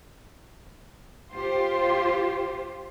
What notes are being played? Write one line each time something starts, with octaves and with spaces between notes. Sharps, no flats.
F4 G4 C5